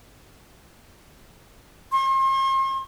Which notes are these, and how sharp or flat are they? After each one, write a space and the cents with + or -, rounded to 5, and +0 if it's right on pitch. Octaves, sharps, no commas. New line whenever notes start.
C6 +40